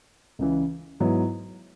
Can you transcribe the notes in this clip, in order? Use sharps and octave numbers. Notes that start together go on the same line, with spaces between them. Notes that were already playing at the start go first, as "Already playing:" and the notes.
C#2 C#3 E3
G#2 F#3 B3 E4